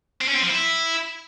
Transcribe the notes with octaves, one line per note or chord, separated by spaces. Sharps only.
C4
C#4
C4
F3
E4